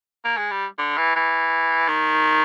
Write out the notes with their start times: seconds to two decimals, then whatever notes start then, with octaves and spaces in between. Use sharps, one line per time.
0.25 A#3
0.37 G#3
0.51 G3
0.79 D3
0.97 E3
1.16 E3
1.88 D#3